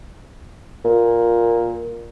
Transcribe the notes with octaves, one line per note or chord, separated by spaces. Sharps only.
A#2